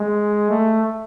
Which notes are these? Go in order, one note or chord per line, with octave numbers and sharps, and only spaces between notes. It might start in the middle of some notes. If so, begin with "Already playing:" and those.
Already playing: G#3
A3